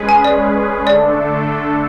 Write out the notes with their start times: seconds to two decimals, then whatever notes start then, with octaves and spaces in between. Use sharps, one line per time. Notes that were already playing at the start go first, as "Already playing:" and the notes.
Already playing: G#3 C#4 G#4 B4
0.09 G#5
0.24 D5
0.87 D3 A3 D4 A4 D5